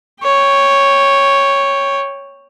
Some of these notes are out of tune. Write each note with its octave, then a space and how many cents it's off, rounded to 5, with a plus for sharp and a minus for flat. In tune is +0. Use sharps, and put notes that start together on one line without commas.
C#5 +0 G5 +15